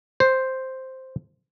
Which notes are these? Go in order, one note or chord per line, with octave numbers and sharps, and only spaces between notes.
C5